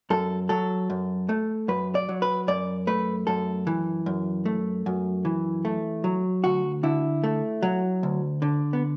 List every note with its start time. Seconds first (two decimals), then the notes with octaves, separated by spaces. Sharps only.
0.10 F#2 A4
0.49 F#3 A4
0.90 F#2
1.29 A3
1.68 F#2 B4
1.95 D5
2.09 F#3
2.22 B4
2.48 F#2 D5
2.87 A3 B4
3.27 F#2 A4
3.67 E3
4.06 F#2
4.46 A3
4.86 F#2
5.25 E3
5.65 A3
6.04 F#3
6.44 D2 F#4
6.83 D3 E4
7.24 A3
7.63 F#3
8.03 D2
8.42 D3
8.73 B3